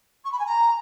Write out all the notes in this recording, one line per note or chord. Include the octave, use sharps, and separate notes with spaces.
C#6
B5
G#5
A#5